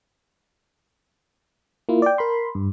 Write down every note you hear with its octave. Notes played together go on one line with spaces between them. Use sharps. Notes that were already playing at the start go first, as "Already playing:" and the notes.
A#3 E4 F4
D5 G5
A#4 B5 C6
G2